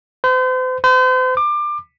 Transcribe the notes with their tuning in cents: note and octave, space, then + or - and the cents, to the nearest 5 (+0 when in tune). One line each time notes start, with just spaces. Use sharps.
C5 -40
C5 -40
D6 +25